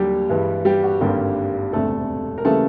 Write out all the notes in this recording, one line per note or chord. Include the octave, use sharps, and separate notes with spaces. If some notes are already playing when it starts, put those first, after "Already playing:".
Already playing: D#2 D3 F#3 G3 G4
G2 E3 G#3
G3 G4
F#4
G#1 G2 D3 G3 A#3 G4
E1 D2 C3 A3 A4
A#4
C#3 E3 G3 A3 A#3 A4